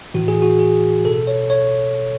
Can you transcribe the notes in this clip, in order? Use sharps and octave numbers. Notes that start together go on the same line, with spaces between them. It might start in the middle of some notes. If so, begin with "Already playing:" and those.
A2 E3 F#4
G#4
F#4
G#4
B2 A4
C#5
C#5